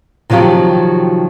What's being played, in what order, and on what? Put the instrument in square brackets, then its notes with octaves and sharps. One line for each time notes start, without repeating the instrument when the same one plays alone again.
[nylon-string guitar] C3 D#3 F3 F#3 G4